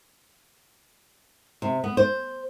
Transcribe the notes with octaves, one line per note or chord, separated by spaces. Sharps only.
C3
B3
C5